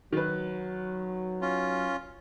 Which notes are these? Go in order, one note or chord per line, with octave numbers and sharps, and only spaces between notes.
D#3 F#3 B4
C#4 F4